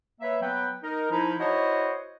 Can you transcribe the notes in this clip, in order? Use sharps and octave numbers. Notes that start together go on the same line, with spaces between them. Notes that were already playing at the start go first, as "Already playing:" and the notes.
A#3 B4 C#5 E5
F#3 B3 B4 G5
D#4 A#4
F3 D#4 E4
E4 F#4 C5 C#5 D#5